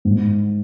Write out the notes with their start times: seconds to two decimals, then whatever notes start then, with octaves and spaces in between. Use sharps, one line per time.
0.05 G#2